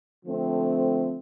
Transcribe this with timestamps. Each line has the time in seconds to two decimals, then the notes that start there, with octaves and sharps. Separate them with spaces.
0.25 D3 F3 A3 C4